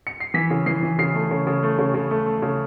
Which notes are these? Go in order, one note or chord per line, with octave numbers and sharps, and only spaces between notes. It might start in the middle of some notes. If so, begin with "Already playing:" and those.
C#7
C7
E3 B6
C#3
E3 C7
E3
C#3 C7
A3
C#3
C#3
A3
C#3
C#3
A3
A3
C#3